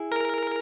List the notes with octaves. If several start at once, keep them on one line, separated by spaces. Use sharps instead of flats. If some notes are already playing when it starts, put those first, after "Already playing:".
Already playing: E4 G#4
A#4